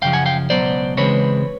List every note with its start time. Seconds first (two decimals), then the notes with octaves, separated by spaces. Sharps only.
0.02 F#2 C#3 F3 F5 G5
0.13 F#5 G#5
0.26 F5 G5
0.50 C#2 B2 F#3 B3 C5 D5
0.97 C#3 E3 G#3 C4 B4 C#5